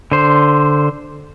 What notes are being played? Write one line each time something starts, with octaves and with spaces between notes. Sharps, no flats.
D3 C5